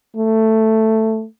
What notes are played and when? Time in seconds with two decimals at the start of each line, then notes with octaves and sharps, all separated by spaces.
0.16 A3